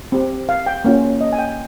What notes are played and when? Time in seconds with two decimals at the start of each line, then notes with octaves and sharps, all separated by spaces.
0.12 C4 G4
0.49 F5
0.66 G5
0.85 A#3 C#4 F4
1.21 D#5
1.33 G#5
1.39 G5